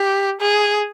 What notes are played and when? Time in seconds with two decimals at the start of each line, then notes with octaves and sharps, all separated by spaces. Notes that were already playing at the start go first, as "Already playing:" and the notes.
Already playing: G4
0.41 G#4